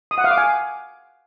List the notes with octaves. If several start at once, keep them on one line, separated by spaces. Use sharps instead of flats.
D#6
F#5
F5
D6
G#5